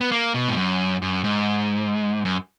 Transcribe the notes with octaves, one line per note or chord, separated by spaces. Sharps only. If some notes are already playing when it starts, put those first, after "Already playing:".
B3
A#3
B2
G#2
F#2
F#2
G#2
F#2